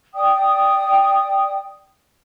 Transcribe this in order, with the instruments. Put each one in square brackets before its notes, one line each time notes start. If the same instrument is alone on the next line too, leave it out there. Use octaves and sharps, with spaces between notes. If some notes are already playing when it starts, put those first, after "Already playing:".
[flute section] D5 G5 D#6